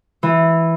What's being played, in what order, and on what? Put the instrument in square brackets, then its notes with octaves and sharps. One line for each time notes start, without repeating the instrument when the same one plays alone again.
[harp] E3